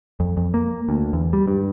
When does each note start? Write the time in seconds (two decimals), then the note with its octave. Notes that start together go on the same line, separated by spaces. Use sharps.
0.20 F2
0.37 F2
0.54 A#3
0.89 D2
1.13 E2
1.33 G3
1.47 G2